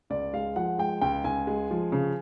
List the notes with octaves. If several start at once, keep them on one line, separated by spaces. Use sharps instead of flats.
C#2 D5
G#3 F5
F3 F#5
G#3 G5
C#2 G5
C#2 G#5
G#3
F3
C#3